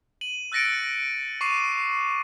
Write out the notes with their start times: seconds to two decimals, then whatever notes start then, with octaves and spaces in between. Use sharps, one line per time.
0.21 D#7 F#7
0.52 E6 F#6 A6 A#6 C#7 D7
1.41 C#6 D6 C7 D#7